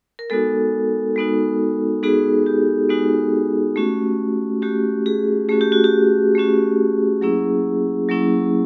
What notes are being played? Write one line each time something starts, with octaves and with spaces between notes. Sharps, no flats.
A#4
G#3 B3 D#4 F#4 A4
G#3 B3 D#4 F#4
G#3 B3 D#4 F#4 G#4
G4
G#3 B3 D#4 F#4
A3 C#4 F#4
A3 C#4 F#4 G4
G#4
A3 C#4 F#4 G#4
G4
F#4
G4
A3 C#4 F#4
F#3 A#3 C#4 E4 G#4
F#3 A#3 C#4 E4